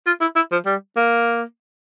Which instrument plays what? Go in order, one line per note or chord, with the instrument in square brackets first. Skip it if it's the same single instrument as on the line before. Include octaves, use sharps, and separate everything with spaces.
[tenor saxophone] F4
E4
E4
F3
G3
A#3